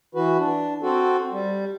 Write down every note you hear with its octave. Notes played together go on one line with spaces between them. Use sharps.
E3 F#4 B4
D4
C4 F#4 A4
G3